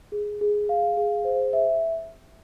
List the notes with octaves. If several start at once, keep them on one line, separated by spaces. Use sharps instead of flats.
G#4
G#4
F5
G#4
C5
E5